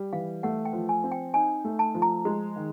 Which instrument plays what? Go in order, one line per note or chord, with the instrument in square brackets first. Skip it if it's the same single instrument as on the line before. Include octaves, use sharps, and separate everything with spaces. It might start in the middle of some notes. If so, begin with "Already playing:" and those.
Already playing: [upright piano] G3
[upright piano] E3 [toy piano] F5
[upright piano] A3 [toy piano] F#5
[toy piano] G5
[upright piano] F3
[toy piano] G#5
[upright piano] C4
[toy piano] G5
[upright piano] D#4 [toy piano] G#5
[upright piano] A3
[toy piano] A5
[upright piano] F3
[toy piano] A#5
[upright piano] G#3
D#3